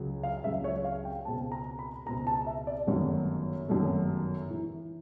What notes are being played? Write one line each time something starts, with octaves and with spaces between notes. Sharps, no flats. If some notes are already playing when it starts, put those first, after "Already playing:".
Already playing: C#2 C#3 F#3
F5
C#2 C#3 F#3 E5
C#5
F5
G5
C#2 B2 G#3 C4 A5
A#5
B5
C#2 B2 G#3 C4 A#5
A5
E5
D5
G1 F#2 D#3 F#3 A3 C#5
G1 F#2 D#3 F#3 A3
E3